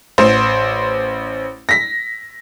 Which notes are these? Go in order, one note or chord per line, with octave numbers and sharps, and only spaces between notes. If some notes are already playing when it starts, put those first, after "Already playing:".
A1 C5
A#6 B6